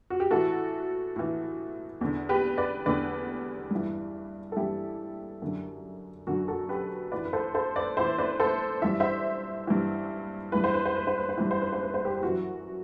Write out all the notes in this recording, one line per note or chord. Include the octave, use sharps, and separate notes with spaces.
F#4
G4
A2 E3 F#4 A4
A2 E3
E2 D3
G4 B4
B4 D5
E2 D3 B4 D5
G2 E3
A4
G2 E3 E4 G4
F#2 D3
F#2 D3 F#4
F#4 A4
G4 B4
A2 E3 B4 D5
B4
A4 C5
A4 C5
B4 D5
A2 E3 C5 E5
B4 D5
A4 C5
G2 E3 E5
C5 E5
G2 E3
G2 E3 B4
C5
B4
C5
B4
C5
B4
C5
G2 E3 B4
C5
B4
C5
B4
C5
G4 B4
G4
F#2 E3 F#4